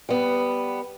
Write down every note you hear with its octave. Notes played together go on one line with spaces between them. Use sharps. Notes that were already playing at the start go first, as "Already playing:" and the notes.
G3 B3